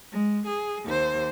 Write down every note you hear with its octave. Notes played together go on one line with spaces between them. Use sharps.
G#3
G#4
D#2 C5